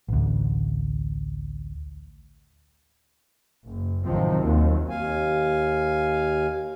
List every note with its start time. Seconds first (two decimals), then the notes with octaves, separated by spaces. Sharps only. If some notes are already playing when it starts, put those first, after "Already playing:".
0.08 A1 D2
3.65 F#1
4.04 A1 C3 D#3 F3 F#3 C4
4.42 D#2 F#3
4.89 D#2 F5 G#5